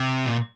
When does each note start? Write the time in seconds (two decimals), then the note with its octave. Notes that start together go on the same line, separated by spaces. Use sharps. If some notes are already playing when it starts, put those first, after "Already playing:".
Already playing: C3
0.26 A#2